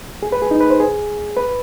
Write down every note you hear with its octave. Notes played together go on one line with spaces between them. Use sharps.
G#4
B4
G#4
D#4
B4
C5
G#4
B4